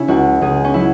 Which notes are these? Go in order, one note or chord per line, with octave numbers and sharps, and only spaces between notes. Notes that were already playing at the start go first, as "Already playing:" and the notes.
Already playing: C#3 C#4 E4
C#2 F#4
C#2 G#4
C#4
F#3 E4